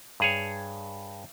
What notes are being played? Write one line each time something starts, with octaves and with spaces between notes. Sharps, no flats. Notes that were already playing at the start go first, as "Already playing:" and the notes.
G2 G#4 C#5